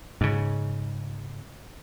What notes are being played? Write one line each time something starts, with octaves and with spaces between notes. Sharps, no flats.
G#2 C#3